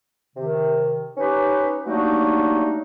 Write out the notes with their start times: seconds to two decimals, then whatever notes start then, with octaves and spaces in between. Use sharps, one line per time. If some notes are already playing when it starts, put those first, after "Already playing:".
0.37 C3 D#3
1.17 C#4 D#4 G4 B4
1.86 F#3 G3 A3 A#3 D4 D#4